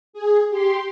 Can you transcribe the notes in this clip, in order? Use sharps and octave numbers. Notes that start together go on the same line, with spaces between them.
G#4
G4 C6